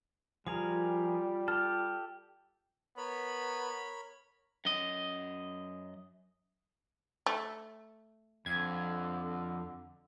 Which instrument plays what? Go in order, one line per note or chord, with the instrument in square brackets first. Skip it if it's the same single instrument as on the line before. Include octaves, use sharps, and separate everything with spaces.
[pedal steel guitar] F3 G#4 A#4 [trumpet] G3 [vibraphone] F4
[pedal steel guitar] G4 A4 [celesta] F6
[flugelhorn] B3 [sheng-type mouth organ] A#4 C#5 B5
[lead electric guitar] F#2 D#5
[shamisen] A3
[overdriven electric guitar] F2 [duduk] D3 [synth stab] G#6